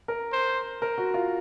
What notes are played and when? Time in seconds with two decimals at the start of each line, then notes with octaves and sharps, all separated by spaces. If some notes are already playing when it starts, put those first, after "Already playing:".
0.08 A#4
0.32 C5
0.82 A#4
0.98 F#4
1.14 F4